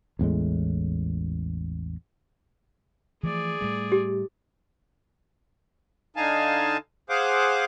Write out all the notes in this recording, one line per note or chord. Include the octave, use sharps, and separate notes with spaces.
A1 E2 A2 G#3
E3 F3 A3 G#4 D5
A2 G3 A3
G4
D3 D#4 F5 G#5 A5
G#4 C5 F5 F#5 D6